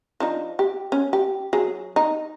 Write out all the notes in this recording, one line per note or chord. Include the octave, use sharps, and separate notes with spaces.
F3 D4 D#4
G4
C#4
G4
F#3 G#4
D#4